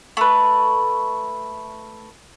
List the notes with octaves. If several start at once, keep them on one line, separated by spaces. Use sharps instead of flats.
A3 B4